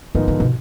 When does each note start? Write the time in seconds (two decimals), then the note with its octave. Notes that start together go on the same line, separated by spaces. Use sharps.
0.15 G#2 D#3 F3 B3 D#4 A#4
0.28 D3
0.40 B2